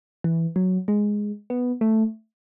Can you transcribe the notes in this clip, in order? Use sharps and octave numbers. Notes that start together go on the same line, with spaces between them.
E3
F#3
G#3
B3
A3